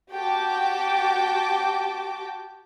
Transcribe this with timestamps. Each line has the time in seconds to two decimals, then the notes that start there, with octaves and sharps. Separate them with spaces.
0.12 F#4 G4 G5 A5 D6